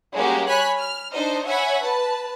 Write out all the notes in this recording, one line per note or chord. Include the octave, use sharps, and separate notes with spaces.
G3 G#3 A#3 C#4 F#4 G4
C#5 G#5 B5 F#6 B6
F6
D4 D#4 C5 D#5
C#5 E5 F#5 G#5 B5 C#6
B4 A5